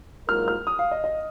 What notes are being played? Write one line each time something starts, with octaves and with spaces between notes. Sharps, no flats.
G#2 F#3 A#3 F4 A#4 F6
F6
D#6
F5
D#5
D#5